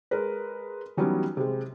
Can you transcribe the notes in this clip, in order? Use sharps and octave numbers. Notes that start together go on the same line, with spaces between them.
G#3 A#4 B4
E3 F#3 G3 B3 C#4 D#4
C3 G#3